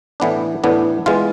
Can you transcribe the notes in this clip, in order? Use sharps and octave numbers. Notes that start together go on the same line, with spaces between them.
A2 E3 B3 D4
A2 E3 B3 D4
E3 G#3 B3 F4